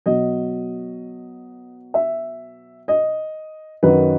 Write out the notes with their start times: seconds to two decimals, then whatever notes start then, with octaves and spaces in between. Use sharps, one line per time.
0.06 B2 F#3 D#5
1.94 E5
2.88 D#5
3.83 F#2 D#3 F#3 B4